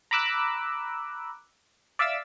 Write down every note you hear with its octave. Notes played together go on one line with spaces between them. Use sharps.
A#5 B5 D6 E6 F#6
D5 E5 F5 D6 E6